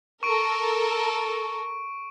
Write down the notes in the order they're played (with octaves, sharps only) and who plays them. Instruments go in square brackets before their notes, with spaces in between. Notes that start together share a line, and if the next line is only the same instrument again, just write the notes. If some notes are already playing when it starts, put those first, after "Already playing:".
[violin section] A4 A#4 [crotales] C#6 D7